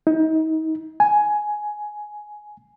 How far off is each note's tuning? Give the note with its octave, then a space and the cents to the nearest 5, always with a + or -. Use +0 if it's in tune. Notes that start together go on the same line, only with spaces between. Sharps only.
D#4 +35
G#5 +10